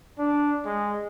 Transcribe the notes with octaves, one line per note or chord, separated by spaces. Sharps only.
D4
G#3